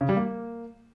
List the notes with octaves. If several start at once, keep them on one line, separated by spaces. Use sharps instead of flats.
C#3
G3
A#3